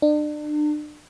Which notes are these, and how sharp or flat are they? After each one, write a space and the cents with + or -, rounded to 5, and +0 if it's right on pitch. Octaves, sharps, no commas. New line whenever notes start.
D4 +35